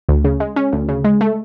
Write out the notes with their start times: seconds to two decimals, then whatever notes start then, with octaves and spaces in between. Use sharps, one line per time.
0.09 D2
0.24 C#3
0.40 G#3
0.56 C#4
0.73 D2
0.89 C#3
1.04 G#3
1.21 A3